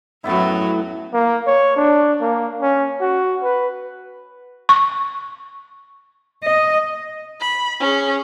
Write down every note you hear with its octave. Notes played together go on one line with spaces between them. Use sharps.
F#2 A2 F#3 B3 E4
A#3
C#5
D4
A#3
C#4
F#4
B4
C#6
D#5
B5
C#4 G#4